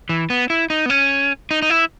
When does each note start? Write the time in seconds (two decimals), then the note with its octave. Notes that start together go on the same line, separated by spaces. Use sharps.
0.09 E3
0.30 B3
0.50 E4
0.70 D#4
0.86 B3
0.90 C#4
1.51 D#4
1.62 D#4
1.70 E4